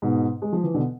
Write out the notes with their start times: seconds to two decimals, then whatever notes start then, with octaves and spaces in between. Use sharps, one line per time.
0.02 G#2 B2
0.42 G#3
0.53 F3
0.63 E3
0.74 B2 D3